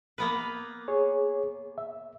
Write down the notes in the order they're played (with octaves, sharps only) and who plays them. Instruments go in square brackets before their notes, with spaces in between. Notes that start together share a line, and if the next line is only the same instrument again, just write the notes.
[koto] A#3 B3 B4
[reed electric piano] G#4 C#5
E5